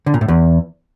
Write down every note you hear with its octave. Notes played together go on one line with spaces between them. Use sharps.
D3
A#2
A2
E2